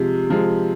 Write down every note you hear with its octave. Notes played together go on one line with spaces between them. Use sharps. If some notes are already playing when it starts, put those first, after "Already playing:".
Already playing: C3 F3 G#3
C3 F3 G#3